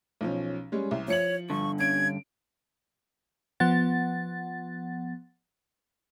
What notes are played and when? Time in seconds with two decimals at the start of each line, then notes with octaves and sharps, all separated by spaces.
0.21 B1 F3 C#4
0.72 G3 G#3 C#4
0.91 C2
1.08 F3 C#5 C#7 F#7
1.50 G2 D3 C#6
1.79 C#4 G#6 D7
3.60 F3 B3 F#5 A6